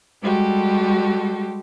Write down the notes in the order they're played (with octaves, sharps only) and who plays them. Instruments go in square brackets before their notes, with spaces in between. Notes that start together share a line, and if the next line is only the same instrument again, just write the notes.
[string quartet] G3 G#3 F#4 G4 A4